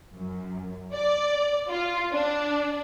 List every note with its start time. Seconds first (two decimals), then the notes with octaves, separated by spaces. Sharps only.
0.15 F#2
0.93 D5
1.69 F4
2.14 D4